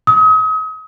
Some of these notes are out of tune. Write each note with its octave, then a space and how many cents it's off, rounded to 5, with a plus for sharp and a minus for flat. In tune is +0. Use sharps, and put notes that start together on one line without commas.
D#6 +40